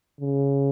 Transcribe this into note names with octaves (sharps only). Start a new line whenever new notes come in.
C#3